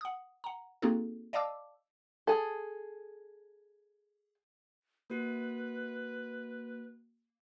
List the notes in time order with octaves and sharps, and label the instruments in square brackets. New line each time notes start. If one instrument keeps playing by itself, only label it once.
[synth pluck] F#5 D#6
F#5 A#5
A#3 C4 D#4 F#4 G#4 A4
D5 D#5 F5 A5 D6 E6
[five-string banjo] G#4 A4
[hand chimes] A#3 F#4 [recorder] B4